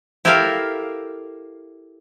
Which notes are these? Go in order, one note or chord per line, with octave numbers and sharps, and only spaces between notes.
E4 G4 A4 A#4 E5 F5